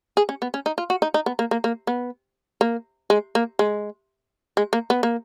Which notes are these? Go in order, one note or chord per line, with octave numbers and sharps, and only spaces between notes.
G#4
C#4
B3
C#4
D#4
F4
F#4
D#4
D#4
B3
A#3
A#3
A#3
B3
A#3
G#3
A#3
G#3
G#3
A#3
B3
A#3